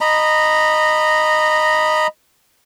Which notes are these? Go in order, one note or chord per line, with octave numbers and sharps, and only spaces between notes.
D#5 A#5 B5